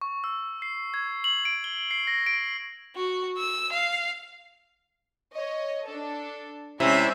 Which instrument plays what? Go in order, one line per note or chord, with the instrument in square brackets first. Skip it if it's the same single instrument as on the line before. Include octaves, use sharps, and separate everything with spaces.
[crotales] C#6
E6
C7
G#6
F#7
D7
G7
C7
A#6
D7
[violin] F#4
E6
F5
[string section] C#5 D#5
D4 A4
[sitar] C3 [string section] G#3 C#4 D5 [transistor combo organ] E4